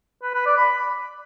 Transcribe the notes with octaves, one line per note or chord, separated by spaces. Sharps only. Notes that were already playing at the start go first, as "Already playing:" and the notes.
B4
B4
D5
B5